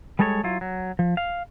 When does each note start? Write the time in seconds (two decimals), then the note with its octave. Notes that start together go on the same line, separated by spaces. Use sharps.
0.19 G3 G#3 G#4 A4 C5 C#5
0.44 F#3 E4 F4
0.61 F#3
0.99 F3
1.17 F5